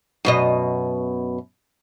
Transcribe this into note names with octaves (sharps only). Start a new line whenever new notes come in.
F#2 B2 D#5